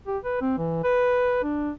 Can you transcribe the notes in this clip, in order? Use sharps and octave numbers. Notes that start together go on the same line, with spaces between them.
G4
B4
C4
E3
B4
D4